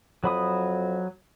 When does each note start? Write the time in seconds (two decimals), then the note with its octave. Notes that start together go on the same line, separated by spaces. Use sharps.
0.24 F2 F#3 B5 D#6